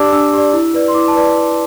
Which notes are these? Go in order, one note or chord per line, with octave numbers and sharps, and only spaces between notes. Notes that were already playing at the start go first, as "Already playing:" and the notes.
Already playing: D4 G4 D5 A5 D6 E6
D4 E6
G4 D5
E4
B4 D5
C6
E4 D6
A5
B4 D5